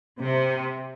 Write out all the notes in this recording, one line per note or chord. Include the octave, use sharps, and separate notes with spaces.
C3